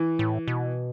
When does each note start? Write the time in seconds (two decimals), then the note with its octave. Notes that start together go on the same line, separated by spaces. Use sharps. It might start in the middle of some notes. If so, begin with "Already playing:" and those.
Already playing: E3
0.19 A2
0.48 B2